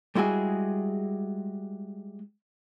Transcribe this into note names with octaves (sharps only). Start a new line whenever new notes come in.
G3 G#3 E4 F#4 G#4